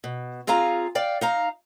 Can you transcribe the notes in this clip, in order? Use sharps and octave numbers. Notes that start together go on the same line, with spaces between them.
B2
C4 F4 G#4 F5 A#5
D5 F5 G5
D#4 F5 A#5